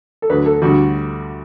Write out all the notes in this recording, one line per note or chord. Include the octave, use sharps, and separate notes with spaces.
A4
D2 D3 F#3 B4
A4
D2 D3 G3 F#4